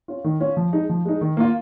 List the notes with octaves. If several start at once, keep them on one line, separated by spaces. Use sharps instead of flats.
C#4 F4
D#3
C#4 F4
F3
G#3 D#4
F3
G#3 D#4
D#3
A#3 F4